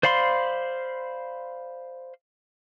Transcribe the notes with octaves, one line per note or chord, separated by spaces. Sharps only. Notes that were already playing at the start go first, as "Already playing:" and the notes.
C5 D5 F5 B5 C6